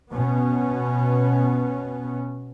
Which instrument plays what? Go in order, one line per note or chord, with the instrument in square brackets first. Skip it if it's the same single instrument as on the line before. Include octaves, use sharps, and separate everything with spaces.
[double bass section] B2 B3 C#4